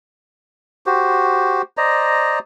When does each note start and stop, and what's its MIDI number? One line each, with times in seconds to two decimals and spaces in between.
0.86 1.62 66
0.86 1.62 67
0.86 1.62 72
1.77 2.39 72
1.77 2.39 74
1.77 2.39 75
1.77 2.39 82